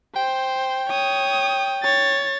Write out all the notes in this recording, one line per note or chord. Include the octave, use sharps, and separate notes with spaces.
C5 G5
C#5 D#6
C#5 A6